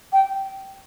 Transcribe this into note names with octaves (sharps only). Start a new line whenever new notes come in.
G5